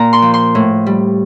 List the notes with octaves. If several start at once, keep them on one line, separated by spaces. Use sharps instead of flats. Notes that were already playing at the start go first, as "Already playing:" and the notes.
Already playing: A#2 A#5
C6
F3
C6
A2
G3